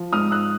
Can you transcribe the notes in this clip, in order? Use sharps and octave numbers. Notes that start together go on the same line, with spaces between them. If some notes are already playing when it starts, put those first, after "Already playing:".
Already playing: F3
G#2 D#6 F6
E6 F#6